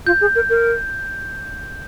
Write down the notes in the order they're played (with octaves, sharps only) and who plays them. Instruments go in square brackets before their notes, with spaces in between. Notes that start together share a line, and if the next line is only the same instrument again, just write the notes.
[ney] F4 [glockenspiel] G6
[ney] G#4
A#4
A#4